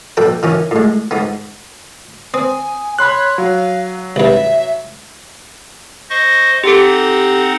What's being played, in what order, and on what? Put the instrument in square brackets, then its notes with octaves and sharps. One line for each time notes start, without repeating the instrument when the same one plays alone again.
[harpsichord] A#1 A4 B4 G5
D#3 E3 C#4
A2 G#3
G#2 B3
[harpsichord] C4 [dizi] G#5 [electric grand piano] D#6
[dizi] C#5 [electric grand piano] B5 C6 F#6
[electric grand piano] F#3 [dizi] F5
[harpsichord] C2 G2 [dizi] E5
[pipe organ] C5 D#5 C#6
[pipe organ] C4 D#4 F#5 [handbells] G4 A4